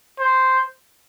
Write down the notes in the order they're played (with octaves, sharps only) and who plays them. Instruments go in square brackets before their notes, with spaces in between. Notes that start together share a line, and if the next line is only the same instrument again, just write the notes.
[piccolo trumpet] C5